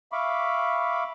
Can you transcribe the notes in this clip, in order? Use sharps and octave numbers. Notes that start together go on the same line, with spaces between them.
E5 F5 B5 C#6 D6